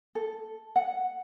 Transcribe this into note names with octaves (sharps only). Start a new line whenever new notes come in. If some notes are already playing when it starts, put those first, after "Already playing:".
A4
F#5